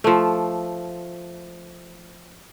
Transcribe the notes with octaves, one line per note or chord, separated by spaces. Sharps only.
F3 A3